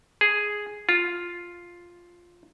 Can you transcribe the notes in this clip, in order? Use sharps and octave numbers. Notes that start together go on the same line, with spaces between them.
G#4
F4